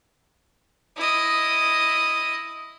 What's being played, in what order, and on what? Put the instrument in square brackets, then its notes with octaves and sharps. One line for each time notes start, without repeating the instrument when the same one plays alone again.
[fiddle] E4 D#5